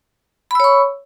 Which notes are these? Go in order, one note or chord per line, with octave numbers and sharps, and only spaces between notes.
C#5 B5 C#6 E6